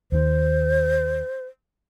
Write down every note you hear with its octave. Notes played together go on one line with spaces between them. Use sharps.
D#2 D#3 C5